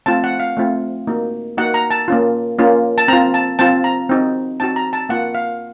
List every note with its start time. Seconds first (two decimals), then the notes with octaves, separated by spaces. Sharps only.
0.06 A3 C4 F4 A5
0.24 F#5
0.40 F5
0.57 A3 C4 F4
1.07 A#3 D#4 F#4
1.58 A#3 D#4 F#4 F#5
1.74 A#5
1.91 A5
2.08 A#3 C#4 F4
2.58 A#3 C#4 F4
2.98 A5
3.08 C4 A#5
3.13 F4
3.34 A5
3.59 C4 F4 A5
3.84 A#5
4.09 C4 D#4 F#4
4.60 C4 D#4 F#4 A5
4.76 A#5
4.93 A5
5.09 A#3 F4 F#5
5.35 F5